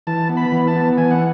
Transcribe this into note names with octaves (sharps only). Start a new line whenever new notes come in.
E3 A5
B3
B5
E3
A5
B3
E3 G#5
F#5